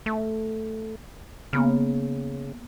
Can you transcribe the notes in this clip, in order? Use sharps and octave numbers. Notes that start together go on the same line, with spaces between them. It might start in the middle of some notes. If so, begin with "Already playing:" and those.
A3
C#3 A#3 B3 F6